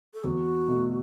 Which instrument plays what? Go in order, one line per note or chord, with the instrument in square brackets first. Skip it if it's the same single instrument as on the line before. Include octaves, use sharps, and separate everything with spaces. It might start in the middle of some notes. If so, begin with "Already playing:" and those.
[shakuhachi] A4
[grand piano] E2 [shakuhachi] F#4
[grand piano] B2 A3